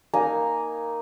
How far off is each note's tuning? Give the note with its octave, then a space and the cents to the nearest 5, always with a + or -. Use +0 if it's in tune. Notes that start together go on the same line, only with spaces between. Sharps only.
A#3 +0 D#4 +0 G#5 +0